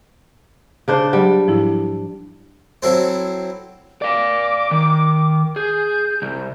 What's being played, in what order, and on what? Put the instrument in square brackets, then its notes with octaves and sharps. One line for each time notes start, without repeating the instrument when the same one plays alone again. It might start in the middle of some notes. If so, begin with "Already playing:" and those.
[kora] C#3 D4 C5
[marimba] F#3 [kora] G3
[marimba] G#2 F3 E4
[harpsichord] F#3 C4 E4 A4 C5
[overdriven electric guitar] D5 F5 [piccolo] D6
[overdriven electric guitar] D#3
[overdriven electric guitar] G#4 [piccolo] G6
[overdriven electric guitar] C2